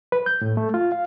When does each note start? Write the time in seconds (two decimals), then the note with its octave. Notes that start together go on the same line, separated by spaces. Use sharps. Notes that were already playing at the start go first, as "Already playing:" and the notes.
0.12 B4
0.26 G6
0.42 A2
0.57 A3
0.74 F4
0.92 F5